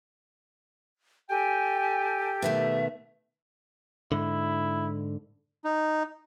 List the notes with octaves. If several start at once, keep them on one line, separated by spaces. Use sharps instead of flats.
G4 A4 G5 G#5
B2 D#3 A3 E5
G#2 D3 E4
D#4